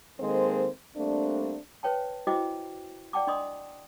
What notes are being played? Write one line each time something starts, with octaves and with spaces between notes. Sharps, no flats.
D#3 G#3 A#3 C4 A4 C5
G3 A3 A#3 C4 D4
B4 C#5 G5 A5
E4 F#4 C5 D#5 G5 D6
D5 F#5 G5 A5 D6
D4 D5 D#5 C6 D#6